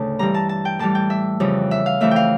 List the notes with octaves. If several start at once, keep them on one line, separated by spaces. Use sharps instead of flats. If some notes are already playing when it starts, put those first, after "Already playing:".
Already playing: D2 A2 C#3 A5
G2 E3 G3 A#5
A5
A5
G5
A2 E3 G3 A5
G5
E5
F2 C#3 E3 G3
E5
F5
F2 E3 A3 E5
F5 G5